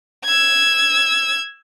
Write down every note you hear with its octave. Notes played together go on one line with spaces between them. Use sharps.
E6 G#6